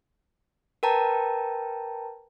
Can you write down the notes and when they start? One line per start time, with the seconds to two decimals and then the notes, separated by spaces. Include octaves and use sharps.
0.83 A#4 B4 G5 A5 A#5